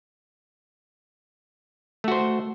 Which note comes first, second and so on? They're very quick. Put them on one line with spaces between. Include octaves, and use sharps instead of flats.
A3 F#4 C5